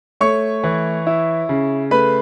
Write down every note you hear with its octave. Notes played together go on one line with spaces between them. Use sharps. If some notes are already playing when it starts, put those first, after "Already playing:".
A3 C#5 C#6
E3
E4
C#3
A3 B4 B5